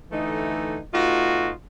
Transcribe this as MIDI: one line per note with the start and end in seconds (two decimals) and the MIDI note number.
0.12 0.78 50
0.12 0.78 52
0.12 0.78 57
0.12 0.78 63
0.93 1.51 47
0.93 1.51 57
0.93 1.51 63
0.93 1.51 65
0.93 1.51 66